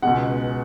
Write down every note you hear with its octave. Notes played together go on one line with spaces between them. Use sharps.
C#2 B2 G#3 F#5